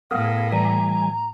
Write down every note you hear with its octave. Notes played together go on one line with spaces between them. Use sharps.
A2 B3 G#4 A#4 F5
E3 G3 G#5 A#5